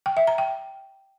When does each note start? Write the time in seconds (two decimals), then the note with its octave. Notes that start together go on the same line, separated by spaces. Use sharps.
0.06 G5
0.17 E5
0.27 A#5
0.38 G5